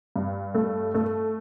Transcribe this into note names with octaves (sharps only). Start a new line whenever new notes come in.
G2
A3
A3